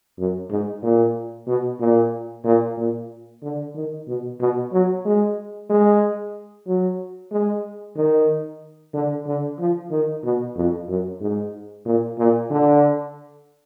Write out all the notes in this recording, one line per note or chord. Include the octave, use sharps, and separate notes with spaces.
F#2
G#2
A#2
B2
A#2
A#2
A#2
D3
D#3
B2
B2
F#3
G#3
G#3
F#3
G#3
D#3
D3
D3
F3
D#3
B2
F2
F#2
G#2
A#2
A#2
D3